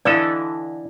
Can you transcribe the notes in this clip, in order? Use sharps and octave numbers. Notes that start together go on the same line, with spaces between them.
D3 E3 D4 E4 A4 D5 D#5 F5